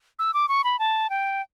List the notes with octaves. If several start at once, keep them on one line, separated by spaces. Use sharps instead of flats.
E6
D6
C#6
B5
A5
G5